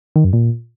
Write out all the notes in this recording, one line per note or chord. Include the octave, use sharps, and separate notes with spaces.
D#3
F#2
A#2